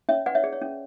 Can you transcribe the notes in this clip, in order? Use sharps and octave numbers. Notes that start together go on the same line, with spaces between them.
C#4 C#5 E5
B4 D5 F#5
C#5 E5
G#4 D5
C#5
C#4